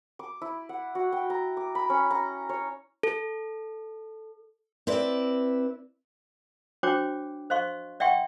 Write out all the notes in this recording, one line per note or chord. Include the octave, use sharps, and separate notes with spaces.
D6
E4
F#5
F#4
G5
A#5
D6
B5
C#4
A#5
C#5
A4
C4 E4 B4 D5
D4 F#4 C5 C#5 G5 D6
C5 D#5 F5 C6 C#6
D5 E5 F#5 G5 C6 C#6